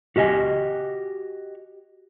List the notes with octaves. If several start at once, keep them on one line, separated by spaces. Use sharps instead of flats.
F#4 G4 D#5 E5 G#5